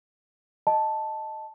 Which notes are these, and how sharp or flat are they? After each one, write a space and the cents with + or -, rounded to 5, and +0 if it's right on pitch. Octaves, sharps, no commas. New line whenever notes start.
D#5 +0 A5 +0